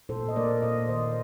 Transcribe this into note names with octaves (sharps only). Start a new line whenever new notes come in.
A#2 A4 C5
D#5
A#3 A#4 D5
A#2 C5 D#5
D#3 C5 D#5